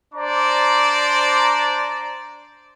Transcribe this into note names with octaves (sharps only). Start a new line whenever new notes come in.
D4 C5 D5 A#5 D6